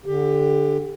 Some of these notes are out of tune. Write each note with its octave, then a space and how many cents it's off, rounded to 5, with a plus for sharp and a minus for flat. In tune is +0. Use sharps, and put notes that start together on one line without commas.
D3 +0 G4 +20